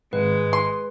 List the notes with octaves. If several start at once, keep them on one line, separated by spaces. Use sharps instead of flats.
G#1 G#3 B4
C6